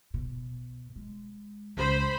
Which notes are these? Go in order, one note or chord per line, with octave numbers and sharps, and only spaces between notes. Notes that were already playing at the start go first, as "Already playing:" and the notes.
B2
G#3
C#2 C5 B5